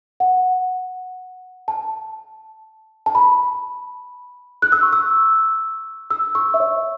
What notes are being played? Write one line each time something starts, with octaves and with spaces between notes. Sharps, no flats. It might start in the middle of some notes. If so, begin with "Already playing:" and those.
F#5
A5
A5
B5
F#6
E6
C#6
E6
E6
C#6
E5
C#5